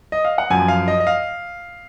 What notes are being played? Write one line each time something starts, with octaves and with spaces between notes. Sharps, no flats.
D#5
F5
F#5
F#2 F3 G#5
F5
D#5
D#5
F5